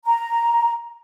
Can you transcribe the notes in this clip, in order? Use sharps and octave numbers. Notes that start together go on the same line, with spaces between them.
A#5